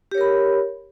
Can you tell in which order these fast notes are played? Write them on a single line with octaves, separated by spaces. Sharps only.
G4 C#5 A#4 B5